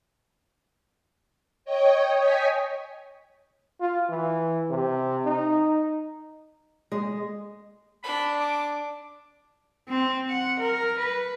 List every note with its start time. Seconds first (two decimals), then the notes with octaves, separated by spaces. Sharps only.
1.65 C#5 D#5 G5
2.16 C#5 D#5 G5 G#5 B6
3.80 F4
4.09 E3
4.70 C3
5.25 D#4
6.92 G#3
8.03 D4 B5
8.40 D6
9.89 C4
10.29 F#5
10.60 A#4
10.98 B4